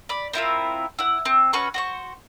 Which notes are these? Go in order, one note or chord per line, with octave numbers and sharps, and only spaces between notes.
D5 B5
C4 E4 F4 A#4
E4 F#5
C4
C#4 F#4 B4 C#6
F#4 C5 C#6